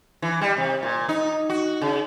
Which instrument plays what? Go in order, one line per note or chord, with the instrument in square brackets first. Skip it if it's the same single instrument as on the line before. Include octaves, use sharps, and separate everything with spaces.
[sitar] E3
G3
C3
A#2
D#4
F#4
C#3